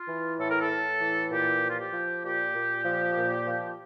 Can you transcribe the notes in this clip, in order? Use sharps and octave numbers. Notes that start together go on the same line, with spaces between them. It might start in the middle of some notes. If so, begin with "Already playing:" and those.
Already playing: F4
E3
A2 A4
A#4
A4
A2
E3
A#2 G4
F3
F4
G4
F3
A#2 G4
A#2
F3
A#2
F3